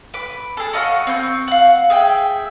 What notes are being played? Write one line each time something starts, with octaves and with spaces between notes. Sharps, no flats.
B4 D6
G#4 A4
F#4 D#5 F5 C#6
C4 C#6 G6
F5 F#5
G#4 E5 G5